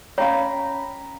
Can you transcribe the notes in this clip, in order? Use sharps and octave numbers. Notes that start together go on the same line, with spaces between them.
C#4 C#5 F5 G5 A#5 B5